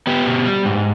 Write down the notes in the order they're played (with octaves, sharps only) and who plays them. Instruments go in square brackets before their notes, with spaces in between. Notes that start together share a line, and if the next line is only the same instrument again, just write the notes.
[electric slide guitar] B3 G4
B2
G3
G#2